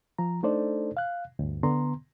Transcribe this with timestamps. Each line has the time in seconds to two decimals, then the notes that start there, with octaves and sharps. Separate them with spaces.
0.18 F3 A#5
0.43 A3 D4 D#4 A4 C5 D5
0.97 F5 F#6
1.39 D2 G2
1.63 D3 B3 A#5 C6